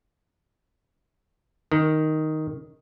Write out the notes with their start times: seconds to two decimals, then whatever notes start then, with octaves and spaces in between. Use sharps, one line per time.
1.72 D#3